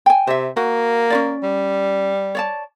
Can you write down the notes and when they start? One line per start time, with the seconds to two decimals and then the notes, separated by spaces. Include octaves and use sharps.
0.06 G5 G#5
0.27 C3 C5 E5
0.57 A#3 F#4
1.10 C#4 F4 D5
1.43 G3
2.35 C#5 D5 A5